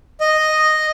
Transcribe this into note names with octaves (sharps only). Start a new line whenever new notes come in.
D#5